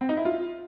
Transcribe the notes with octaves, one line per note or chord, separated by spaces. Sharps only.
C4
D#4
E4
F4